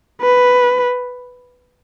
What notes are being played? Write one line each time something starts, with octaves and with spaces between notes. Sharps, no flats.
B4